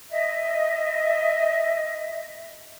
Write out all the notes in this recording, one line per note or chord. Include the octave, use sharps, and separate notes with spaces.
D#5 E5